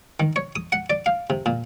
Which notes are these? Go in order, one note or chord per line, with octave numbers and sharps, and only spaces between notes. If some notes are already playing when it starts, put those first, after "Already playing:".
D#3
C#5
D#6
F#5
D5
F5
C3
A#2